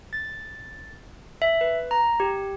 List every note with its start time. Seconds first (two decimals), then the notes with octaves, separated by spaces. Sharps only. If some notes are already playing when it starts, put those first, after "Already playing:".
0.13 A6
1.42 E5
1.61 B4
1.91 A#5
2.20 G4